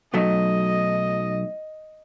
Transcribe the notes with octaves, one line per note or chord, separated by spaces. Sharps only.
B1 F#3 A3 D#5